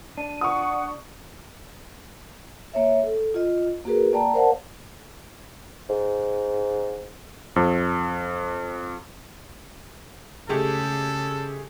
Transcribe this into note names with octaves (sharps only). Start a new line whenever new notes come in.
D4 D#7
F#5 C#6 D#6
A#3 C#5 E5
A4
F4 D#5
A#3 F#4 G#4 A#4 B4
A#3 D5 G5 A5 A#5
A#4 C5 D5 F5 F#5 A5
G#2
F2
C#3 G#3 A3 G4 A4